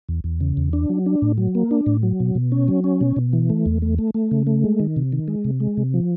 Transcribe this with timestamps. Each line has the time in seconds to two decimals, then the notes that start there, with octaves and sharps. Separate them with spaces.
0.09 E2
0.24 E2
0.41 C#3
0.57 E2
0.73 D4
0.89 F#3
1.06 D4
1.22 A2
1.38 F#3
1.55 A#3
1.71 D4
1.86 A2
2.03 F#3
2.20 B2
2.35 B2
2.52 C#4
2.68 F#3
2.84 C#4
3.01 B2
3.16 B2
3.33 E3
3.50 A3
3.66 E2
3.82 A3
3.99 A3
4.14 A3
4.31 C#3
4.47 A3
4.64 G#3
4.80 D#3
4.96 C3
5.12 D#3
5.28 G#3
5.45 C3
5.60 G#3
5.77 C3
5.94 F3